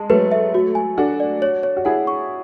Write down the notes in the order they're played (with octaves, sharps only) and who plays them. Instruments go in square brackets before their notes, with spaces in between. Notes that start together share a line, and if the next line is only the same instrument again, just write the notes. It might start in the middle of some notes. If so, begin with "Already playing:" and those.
Already playing: [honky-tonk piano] G#3 [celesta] G#4 A5
[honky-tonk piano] F#3 A3 [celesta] B4
[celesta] E5
F#4
G#5
[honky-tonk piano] D4 F#4 [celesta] A4
[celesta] D5
C#5
C#5
[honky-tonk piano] F#4
[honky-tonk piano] E4 G#4 [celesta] F#5
[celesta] C#6